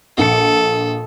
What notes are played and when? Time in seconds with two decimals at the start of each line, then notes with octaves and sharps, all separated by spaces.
0.18 A#1 A4 C#7